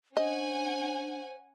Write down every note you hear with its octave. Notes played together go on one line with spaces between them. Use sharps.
C#4 D4 C5 D#5 F#5 G#5